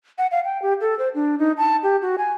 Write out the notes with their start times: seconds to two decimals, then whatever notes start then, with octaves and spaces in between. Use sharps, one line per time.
0.18 F#5
0.31 F5
0.45 G5
0.62 G4
0.81 A4
0.99 C5
1.15 D4
1.39 D#4
1.58 A5
1.83 G4
2.02 F#4
2.18 G#5